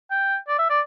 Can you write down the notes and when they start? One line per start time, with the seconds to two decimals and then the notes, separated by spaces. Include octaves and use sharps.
0.11 G5
0.48 D5
0.59 E5
0.70 D5